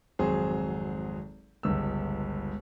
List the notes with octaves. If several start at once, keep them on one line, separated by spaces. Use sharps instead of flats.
G#1 F2 F#3 G#4 C5
G1 C#2 E6